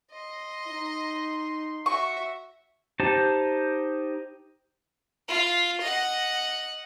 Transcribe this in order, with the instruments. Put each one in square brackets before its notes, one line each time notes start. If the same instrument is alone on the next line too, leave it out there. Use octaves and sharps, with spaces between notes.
[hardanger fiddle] D#5 [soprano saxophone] C6
[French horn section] D#4
[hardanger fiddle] F#4 E5 [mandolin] C#6
[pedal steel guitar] D#4 G4 C5 A5
[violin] F4
D#5 F#5